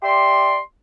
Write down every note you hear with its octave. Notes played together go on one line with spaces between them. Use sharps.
G4 D5 E5 C6